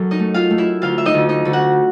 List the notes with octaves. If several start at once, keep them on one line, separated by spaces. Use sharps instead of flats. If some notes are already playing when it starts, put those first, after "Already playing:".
Already playing: F#2 A4
D#4 D#5
A3
F4 F5
A3
E4 E5
D2 F4 F5
E5
D#4 D#5
D2
D#4 D#5
D2
F#4 F#5